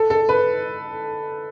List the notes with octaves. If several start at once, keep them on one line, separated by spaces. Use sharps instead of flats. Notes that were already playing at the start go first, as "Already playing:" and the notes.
Already playing: A4
A4
B4